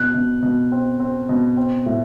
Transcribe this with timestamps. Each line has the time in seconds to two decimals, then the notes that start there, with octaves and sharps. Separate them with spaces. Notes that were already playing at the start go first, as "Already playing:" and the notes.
Already playing: B2 F#6
0.14 B2
0.43 B2
0.72 C4
1.00 C4
1.29 B2
1.57 C4
1.86 A2